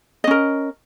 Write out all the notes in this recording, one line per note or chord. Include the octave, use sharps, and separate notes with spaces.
C#4 A#4 D#5